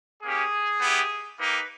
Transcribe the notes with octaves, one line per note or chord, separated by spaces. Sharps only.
A#3 C#4 G4 G#4
B3 E4 G4
A#3 D#4 G4 B4